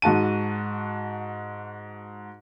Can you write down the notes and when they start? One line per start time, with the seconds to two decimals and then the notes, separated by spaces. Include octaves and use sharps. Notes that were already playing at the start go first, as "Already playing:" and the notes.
0.02 G#2 F#4 A5 D#7